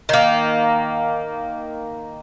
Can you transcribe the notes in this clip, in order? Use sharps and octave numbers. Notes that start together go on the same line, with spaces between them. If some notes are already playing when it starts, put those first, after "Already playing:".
D#3 A#3